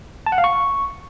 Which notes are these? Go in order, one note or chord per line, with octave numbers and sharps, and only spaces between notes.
A5
F#5
F5
C#6